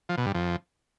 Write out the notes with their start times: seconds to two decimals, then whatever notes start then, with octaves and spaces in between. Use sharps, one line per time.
0.09 F3
0.18 B2
0.26 G2
0.35 F2